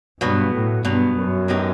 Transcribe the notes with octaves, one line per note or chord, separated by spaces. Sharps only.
G2 B2 F#3 B3
A2
G2 B2 F#3 B3
F#2
A2 F#3 B3 D#4 G4